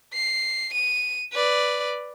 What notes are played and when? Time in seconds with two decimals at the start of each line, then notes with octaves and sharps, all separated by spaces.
0.14 C7
0.74 D#7
1.32 B4 D5